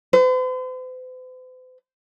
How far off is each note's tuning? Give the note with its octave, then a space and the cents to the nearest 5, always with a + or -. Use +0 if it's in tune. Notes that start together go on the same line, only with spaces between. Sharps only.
C5 -45